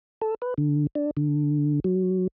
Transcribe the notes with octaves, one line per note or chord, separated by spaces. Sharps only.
A4
B4
D3
D4
D3
F#3